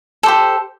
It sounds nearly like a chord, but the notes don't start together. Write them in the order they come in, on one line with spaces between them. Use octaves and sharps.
A4 C5 G4